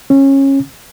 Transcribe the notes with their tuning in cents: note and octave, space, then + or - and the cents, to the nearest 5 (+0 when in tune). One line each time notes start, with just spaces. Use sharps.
C#4 -20